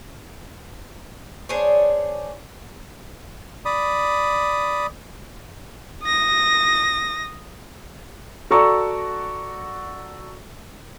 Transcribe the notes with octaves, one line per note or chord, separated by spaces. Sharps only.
D4 G#4 C5 C#5
D5 B5 D#6
D#6 A#6
F#4 A4 D5 A#5 C#6 E6